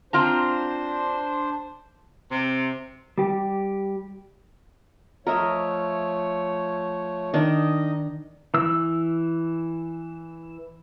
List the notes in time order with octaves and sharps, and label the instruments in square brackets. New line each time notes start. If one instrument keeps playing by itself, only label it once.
[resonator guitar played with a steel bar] C4 F4 A#5 [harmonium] D4 C5
[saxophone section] C3
[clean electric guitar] G3 G4
[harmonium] F3 A3 C#5 [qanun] A#4 D#5 E5
[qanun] D#3 D4 [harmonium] D#4 D#5
[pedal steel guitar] E3 E6